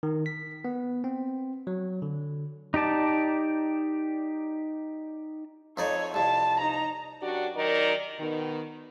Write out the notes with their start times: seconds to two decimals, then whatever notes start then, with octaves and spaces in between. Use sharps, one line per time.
0.03 D#3
0.26 B6
0.65 B3
1.04 C4
1.67 F#3
2.02 D3
2.74 D#4 G4 D5 A5
5.77 F2 D#4 A4 C#5 D5
6.14 C2 F2 A5
6.60 D#4 A#5
7.21 F#2 D4 F#4 G4 D5
7.55 D#3 F#3 D#4 A#4 D5
8.19 B2 D#3